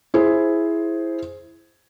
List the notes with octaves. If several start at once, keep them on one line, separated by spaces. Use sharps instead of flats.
E4 G#4 C5